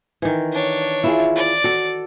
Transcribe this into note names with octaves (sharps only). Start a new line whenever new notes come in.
D#3 E3
D4 C#5
E4 F4 G#4
D5
F#4 A4